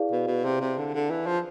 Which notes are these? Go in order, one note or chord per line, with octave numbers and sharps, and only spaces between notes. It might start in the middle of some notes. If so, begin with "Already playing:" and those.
Already playing: E4 G#4 B4 D5 F5
B2
B2
C3
C3
D3
D3
E3
F3